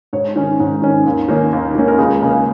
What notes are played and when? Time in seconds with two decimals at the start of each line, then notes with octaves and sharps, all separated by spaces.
0.13 G#2 C#5
0.36 D#3 C#4
0.60 G#2
0.82 D#3 C#4
1.06 D#2
1.28 D#3 A#3 C#4
1.53 D#2
1.75 D#3 A#3 C#4
1.88 A#4
1.98 C#2 G#4
2.22 C#3 A#3 C#4